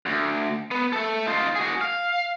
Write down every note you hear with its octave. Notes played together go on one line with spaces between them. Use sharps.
D2
B3
A4 E5
D#4 F4
F#4 G#4
F5